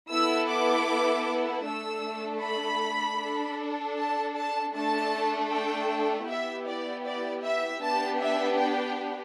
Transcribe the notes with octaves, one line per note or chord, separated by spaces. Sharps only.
B3 E4 A4 E6
D6
A3 D4 A4 E6
B5
D4 A4
A5
A5
A3 D4 A4 A5
G5
B3 E4 G4 E5
D5
D5
E5
B3 D4 G4 A5
E5
G5